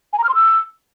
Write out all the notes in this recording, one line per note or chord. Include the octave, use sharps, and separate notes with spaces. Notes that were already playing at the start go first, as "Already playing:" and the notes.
G#5
A#5
F6
C6
E6